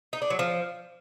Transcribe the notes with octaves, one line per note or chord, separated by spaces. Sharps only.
D#4
D4
F#3
F3